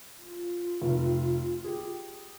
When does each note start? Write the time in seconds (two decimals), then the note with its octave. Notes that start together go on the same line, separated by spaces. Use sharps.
0.22 F4
0.82 F1
1.64 G4 G#4